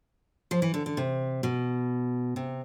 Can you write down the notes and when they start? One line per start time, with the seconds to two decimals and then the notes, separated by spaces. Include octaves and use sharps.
0.51 F3
0.62 E3
0.74 D3
0.86 D3
0.97 C3
1.43 B2
2.36 C3